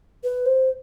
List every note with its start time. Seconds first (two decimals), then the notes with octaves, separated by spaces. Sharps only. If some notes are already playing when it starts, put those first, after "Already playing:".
0.24 B4
0.46 C5